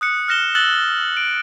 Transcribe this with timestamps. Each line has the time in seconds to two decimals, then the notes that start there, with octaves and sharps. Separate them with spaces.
0.01 D#6 F#6 C#7
0.28 F6 F#6 A#6 E7 G7
0.55 E6 F#6 A6 A#6 F#7 G7
1.17 D7